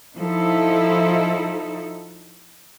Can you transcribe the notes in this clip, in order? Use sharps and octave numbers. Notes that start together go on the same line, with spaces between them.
F3 D#4 E4 A4